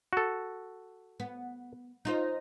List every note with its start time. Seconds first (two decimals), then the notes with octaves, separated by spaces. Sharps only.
0.13 F#4 A4
1.20 B3
2.05 D#4 F4 C5